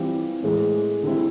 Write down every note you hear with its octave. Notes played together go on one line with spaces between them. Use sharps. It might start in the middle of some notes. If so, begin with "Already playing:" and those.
Already playing: E3 G3 C4 F4
A2 E3 G#3
D3 G3 C4 E4